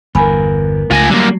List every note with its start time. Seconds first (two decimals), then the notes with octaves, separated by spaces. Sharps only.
0.15 G1 E2 B3 A#4 G#5 B5
0.91 C#2 F3 A3 G#5 A#6
1.10 D3 F#3 G3 A#3